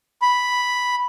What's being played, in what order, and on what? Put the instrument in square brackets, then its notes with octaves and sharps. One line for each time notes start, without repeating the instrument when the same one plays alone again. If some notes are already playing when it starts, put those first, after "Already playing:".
[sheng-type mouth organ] B5